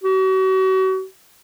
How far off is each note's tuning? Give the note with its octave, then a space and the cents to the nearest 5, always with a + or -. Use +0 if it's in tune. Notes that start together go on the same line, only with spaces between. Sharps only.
F#4 +40